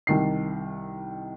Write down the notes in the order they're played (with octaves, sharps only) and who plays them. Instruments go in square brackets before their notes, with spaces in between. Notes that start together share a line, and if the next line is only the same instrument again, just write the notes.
[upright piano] C2 D#3 C7